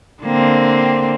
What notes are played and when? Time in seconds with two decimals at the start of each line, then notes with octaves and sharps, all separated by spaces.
0.23 D3 A#3 C4